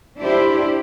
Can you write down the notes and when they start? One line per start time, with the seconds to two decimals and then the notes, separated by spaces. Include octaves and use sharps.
0.18 D4 E4 G4 C5